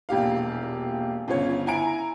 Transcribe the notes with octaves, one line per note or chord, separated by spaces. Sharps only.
E1 A#1 G4 F5
G1 C#3 F4 C#5
E4 G#5 A#5 D7